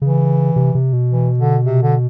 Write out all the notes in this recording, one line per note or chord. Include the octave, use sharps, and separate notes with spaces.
C#3 E3
C3
C3
B2
E3
D3
C3
D3